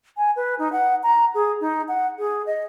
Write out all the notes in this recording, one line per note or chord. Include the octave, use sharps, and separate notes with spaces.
G#5
B4
D#4
F#5
A#5
G#4
D#4
F#5
G#4
D#5